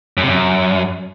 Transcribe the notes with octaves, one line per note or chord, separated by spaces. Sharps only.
F#2
C3
F#2